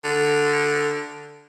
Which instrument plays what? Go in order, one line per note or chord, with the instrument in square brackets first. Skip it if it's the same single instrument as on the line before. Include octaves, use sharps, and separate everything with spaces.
[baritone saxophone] D3